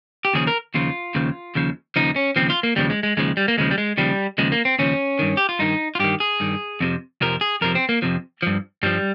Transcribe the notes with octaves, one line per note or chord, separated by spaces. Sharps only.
G4
D#2 C#3 F3 G#4
A#4
D#2 C#3 F3 F4
D#2 C#3 F3
D#2 C#3 F3
D#2 C#3 F3 D#4
C#4
D#2 C#3 F3 C4
F4
A#3
D#2 C#3 F3 G3
G#3
G#3
D#2 C#3 F3 G#3
G3
A#3
D#2 C#3 F3 G#3
G3
G#3
D#2 C#3 F3 G3
D#2 C#3 F3 G#3
A#3
C4
D#2 C#3 F3 C#4
G2 D#3
G4
F4
G2 D#3 D#4
F4
G2 D#3 G4
G#4
G2 D#3
F2 C3 F3
F2 C3 F3 A#4
G#4
F2 C3 F3 A#4
C4
A#3
F2 C3 F3
G2 F3
G2 F3 G3